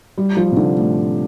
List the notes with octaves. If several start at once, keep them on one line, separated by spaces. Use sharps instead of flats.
G3
F3
C3
D3
A2